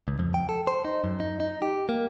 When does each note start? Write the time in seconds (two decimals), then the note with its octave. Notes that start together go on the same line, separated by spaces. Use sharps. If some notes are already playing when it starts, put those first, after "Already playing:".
0.08 C#2
0.19 F2
0.34 G5
0.49 A4
0.67 C5
0.85 D#4
1.04 F#2
1.20 D#4
1.40 D#4
1.62 G4
1.89 A#3